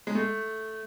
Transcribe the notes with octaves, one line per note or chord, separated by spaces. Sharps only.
G#3
A3